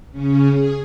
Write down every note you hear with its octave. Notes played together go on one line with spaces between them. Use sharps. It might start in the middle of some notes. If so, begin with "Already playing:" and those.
C#3 C#4
G#4